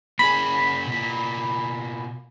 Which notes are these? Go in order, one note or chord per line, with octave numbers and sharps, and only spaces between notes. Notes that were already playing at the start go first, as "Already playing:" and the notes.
A#3 C#4 G#4 B5
B2 A#3